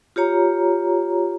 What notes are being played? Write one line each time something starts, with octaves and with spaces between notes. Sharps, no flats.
F4 G4 C#5 A#5